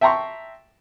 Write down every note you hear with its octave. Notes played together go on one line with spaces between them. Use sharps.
E5 G5 A5 A#5 C6 C#6